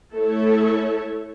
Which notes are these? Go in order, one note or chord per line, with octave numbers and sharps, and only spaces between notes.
A3 E4 A4 C#5